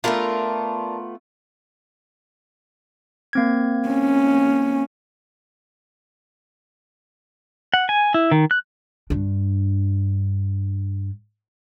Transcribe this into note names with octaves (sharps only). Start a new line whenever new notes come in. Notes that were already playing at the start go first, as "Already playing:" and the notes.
A3 B3 D4 F4 A#4
A#3 C4 G#6
C#4
F#5
G#5
E4
D#3
F#6
G2 D4